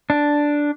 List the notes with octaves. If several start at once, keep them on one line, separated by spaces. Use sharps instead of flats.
D4